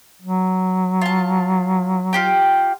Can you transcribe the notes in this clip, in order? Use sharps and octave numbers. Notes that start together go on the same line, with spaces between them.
F#3
F4 A5
F4 G4 G5